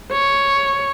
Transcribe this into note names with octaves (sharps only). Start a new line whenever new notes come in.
C#5